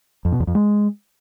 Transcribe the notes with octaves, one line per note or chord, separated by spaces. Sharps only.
F2
B2
E2
F2
G#3